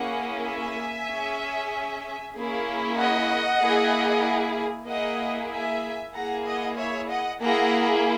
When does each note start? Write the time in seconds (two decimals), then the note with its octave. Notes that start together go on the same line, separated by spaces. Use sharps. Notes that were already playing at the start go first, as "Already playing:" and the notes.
Already playing: A#3 C#4 E4 G#4 F#5
0.44 E5 G#5
1.07 C#4 G#4
2.34 A#3 C#4 E4 G#4
2.97 D#5 F#5
3.60 A#3 E4 G#4
4.87 A#3 E4 G#4 D#5 F#5
5.51 E5 G#5
6.13 A#3 E4 G#4 F#5 A#5
6.45 D#5 F#5
6.77 C#5 E5
7.09 D#5 F#5
7.40 A#3 E4 G#4 F#5 A#5